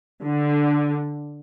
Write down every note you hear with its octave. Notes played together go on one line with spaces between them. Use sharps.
D3